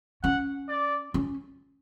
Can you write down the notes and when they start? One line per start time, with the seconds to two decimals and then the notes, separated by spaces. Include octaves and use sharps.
0.23 C#4 F#5
0.69 D5
1.14 C#4